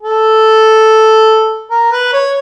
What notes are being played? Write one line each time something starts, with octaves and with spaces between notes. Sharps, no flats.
A4
A#4
B4
C#5